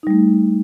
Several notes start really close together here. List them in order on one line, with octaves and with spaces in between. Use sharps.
D#4 G3 A3